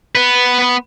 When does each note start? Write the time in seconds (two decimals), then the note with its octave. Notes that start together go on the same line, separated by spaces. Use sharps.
0.15 B3 B4